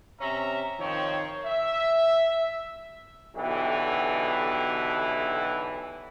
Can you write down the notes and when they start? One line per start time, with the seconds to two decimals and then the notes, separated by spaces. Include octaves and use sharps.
0.20 C3 C#4 E5 A#5
0.80 D#3 F3 C4 C#5
1.45 E5
3.36 B1 B2 D3 E3 G4